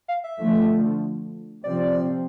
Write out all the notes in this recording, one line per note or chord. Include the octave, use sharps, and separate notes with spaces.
F5
E5
D3 F3 A3
C3 F3 C4 D5